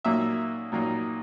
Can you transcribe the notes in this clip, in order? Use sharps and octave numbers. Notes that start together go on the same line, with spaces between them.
A#2 F#3 A#3 D#4 E5
A#2 F#3 A#3 D#4